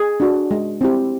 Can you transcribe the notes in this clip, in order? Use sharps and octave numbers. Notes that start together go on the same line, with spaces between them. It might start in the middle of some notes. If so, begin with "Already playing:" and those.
Already playing: G#4
D4 F#4
G#3
C4 E4 G4